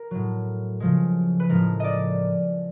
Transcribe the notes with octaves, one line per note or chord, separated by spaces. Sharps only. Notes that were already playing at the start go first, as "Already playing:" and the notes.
Already playing: A#4
A2 F#3
C#3 F3 G#3
B4
A2 F3 G#3 A#4
D5 D#5